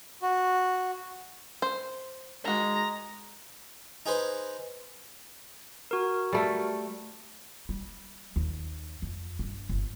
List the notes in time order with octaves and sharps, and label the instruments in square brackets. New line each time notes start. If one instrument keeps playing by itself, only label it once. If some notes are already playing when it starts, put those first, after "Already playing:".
[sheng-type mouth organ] F#4
[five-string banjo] C5
[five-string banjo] D#3 F#4 [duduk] G#3 [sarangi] A#5
[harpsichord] D#4 G#4 B4 C5
[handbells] F#4 A#4
[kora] G3 A3
[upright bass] G3
D#2
F2
G2
G1